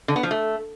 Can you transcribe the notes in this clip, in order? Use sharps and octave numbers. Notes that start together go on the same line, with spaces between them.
D3
B3
F3
A3